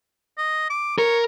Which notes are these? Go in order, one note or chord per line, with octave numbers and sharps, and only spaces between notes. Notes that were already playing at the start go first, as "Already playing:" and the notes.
D#5
D6
A#4 C#5